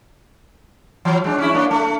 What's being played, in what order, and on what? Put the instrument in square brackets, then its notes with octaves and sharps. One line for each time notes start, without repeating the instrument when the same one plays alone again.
[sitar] E3 F#3
G#3 D4
C#4 E4
A#3 D4
A3